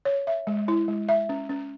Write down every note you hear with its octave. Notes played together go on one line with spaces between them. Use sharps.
C#5
E5
G#3
E4
G#3
E5
C#4
C#4